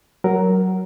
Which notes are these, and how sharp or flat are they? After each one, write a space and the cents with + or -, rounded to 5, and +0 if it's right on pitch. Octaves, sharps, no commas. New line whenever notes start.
F#3 +15 A#4 +0